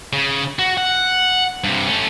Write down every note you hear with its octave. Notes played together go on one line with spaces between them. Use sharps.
C#3
F#4
F#5
G2 C3
A3 C#4